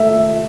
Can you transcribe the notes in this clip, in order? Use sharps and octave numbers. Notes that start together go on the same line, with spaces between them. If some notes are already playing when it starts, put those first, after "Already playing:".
Already playing: A3 E5